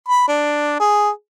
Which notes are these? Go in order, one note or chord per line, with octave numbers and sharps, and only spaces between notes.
B5
D4
G#4